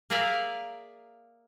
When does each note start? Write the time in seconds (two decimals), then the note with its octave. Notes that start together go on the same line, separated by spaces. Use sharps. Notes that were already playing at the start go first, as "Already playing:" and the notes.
0.10 A#3 G#4 A#4 D5 E5 F5